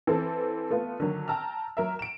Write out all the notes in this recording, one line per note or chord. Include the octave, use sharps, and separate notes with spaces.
E3 C4 A4
A3 B3 F4
D3 D#3 F#3
G5 A5 A#5 E6 F6
F#3 A#4 E5
D7 E7